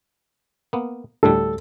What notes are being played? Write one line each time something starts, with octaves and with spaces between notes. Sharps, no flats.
A#3 B3
D2 A2 G3 A4